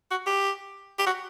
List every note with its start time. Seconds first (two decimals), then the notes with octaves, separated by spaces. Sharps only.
0.11 F#4
0.26 G4
0.99 G4
1.06 F#4